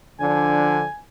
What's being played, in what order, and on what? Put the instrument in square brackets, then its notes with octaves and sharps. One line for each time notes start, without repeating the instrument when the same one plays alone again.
[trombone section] D3 F3 D4 [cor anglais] G#5